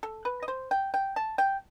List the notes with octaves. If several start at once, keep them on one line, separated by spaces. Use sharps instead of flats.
A4
B4
D#5
C5
G5
G5
A5
G5